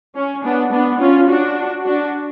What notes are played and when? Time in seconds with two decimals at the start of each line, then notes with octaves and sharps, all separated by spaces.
0.16 C#4
0.44 B3 D4
0.72 B3 D4
1.00 C#4 F4
1.28 D4 F#4
1.84 D4 F#4